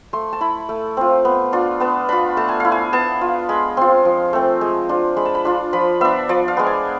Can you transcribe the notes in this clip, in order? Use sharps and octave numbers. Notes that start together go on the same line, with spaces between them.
A3 C6
A5
E4 B5
A3
C4 F4
B3
D4 F4
B3 A5
D4 F4 B5
A3 A5
G#5
E4 F5
G#5
B3 A5
F4
G#3 B5
C4 F4 C6
F3
A3 C4
G#3
D4 F4
G#3 B5
A5
B5
D4 F4 C6
F3 B5
B3 D4 E5
F3 D5
F5
G#3 B3
G#5